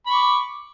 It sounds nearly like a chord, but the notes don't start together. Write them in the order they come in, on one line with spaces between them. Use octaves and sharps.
B5 C#6 D6